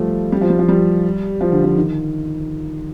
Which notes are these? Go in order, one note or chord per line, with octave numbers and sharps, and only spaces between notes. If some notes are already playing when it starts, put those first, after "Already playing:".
Already playing: F3 G3 A3
G3
F3
G3
F3
G3
F3
D3
F3
D#3